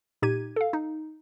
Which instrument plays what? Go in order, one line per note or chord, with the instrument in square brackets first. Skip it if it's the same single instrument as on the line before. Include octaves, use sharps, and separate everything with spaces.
[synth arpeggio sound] A#2 D#4 G4 G#6 D#7
A4 F5
D#4